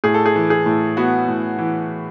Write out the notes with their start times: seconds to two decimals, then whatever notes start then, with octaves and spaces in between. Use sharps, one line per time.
0.04 A2 G#4
0.14 A4
0.26 G#4
0.36 E3
0.50 G#4
0.66 A2
0.97 B3 F#4
1.28 A2
1.59 E3